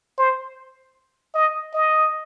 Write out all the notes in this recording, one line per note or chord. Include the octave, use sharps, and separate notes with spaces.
C5
D#5
D#5